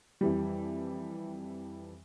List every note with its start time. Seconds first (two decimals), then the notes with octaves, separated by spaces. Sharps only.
0.21 F2 E3 G3